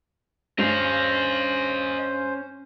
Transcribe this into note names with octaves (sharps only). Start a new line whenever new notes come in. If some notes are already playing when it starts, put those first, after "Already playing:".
G2 C#4 C5 D#5 F5